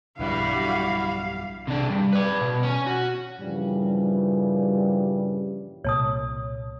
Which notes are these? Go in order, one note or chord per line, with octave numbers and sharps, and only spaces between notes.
B1 G2 D3 F3 G3 E4 F#4 F5
C3 D4
G2
B4 D5
B2
C#4 C#5
F#4
G2 A#2 C#3 E3 F3 G3
C2 A#2 C#5 A5 D#6